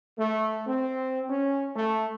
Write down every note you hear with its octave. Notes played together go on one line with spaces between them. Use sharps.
A3
C4
C#4
A3